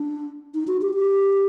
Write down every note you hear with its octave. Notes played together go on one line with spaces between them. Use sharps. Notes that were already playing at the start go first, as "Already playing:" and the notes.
Already playing: D4
D#4
F#4
G4
G4